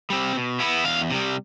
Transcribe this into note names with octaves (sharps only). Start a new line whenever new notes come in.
G3 C4
B2
B3 E4
E2 F5
C3 G3